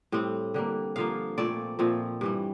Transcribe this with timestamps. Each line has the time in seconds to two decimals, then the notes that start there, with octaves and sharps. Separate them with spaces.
0.12 A2 G3 C4
0.54 D3 G3 A#3
0.96 G2 D3 F3 A#3 F5
1.37 A#2 A3 C4 D5
1.79 A#2 F3 A3 C4
2.21 G2 E3 G3